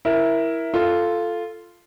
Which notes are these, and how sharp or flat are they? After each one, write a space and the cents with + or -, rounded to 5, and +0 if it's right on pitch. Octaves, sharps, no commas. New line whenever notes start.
E4 +0 A#4 +10
F4 -10 A4 +0